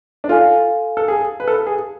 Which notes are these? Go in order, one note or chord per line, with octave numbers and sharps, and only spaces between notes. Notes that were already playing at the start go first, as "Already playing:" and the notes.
D4
F4 A4 F5 G#5
A4
G#4
B4
A4
G#4